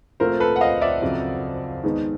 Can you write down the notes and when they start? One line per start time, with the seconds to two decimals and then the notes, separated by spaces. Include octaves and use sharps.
0.20 A#2 F3 A3 C4 A#4 C5
0.40 A4 B4
0.56 F#5
0.61 D#5 F5
0.82 D5 E5
1.02 F2 C#3 F#3
1.84 D#3 G#3 B3 D#4